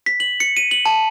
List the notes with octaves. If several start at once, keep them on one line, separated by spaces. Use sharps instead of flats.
B6
F#7
C#7
D#7
F#7
A5